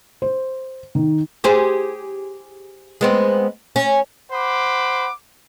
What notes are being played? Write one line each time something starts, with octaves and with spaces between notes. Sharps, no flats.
C5
D#3
G4 G#4 C5
G#3 B3 C4
C#4
C5 F#5 B5 D6